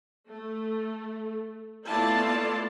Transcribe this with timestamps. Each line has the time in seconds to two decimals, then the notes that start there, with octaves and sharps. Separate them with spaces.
0.29 A3
1.88 A3 B3 E4 F4 D5 A5